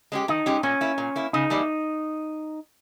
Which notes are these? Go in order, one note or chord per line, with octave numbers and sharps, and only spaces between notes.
G#3 C#4 G4
D#3 D#4
G#3 C#4 G4
A#2 C#4
A#3 E4
A#2
A#3 E4
C#3 D#4
E3 G3 A#3 E4